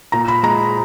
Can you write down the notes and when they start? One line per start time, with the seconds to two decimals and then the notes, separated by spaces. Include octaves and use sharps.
0.12 A#2 A#5
0.28 B5
0.43 G#3 A#5